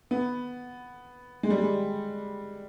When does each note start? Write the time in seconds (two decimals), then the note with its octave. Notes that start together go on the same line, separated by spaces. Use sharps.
0.11 B3
1.43 G#3
1.50 G3
1.58 G#3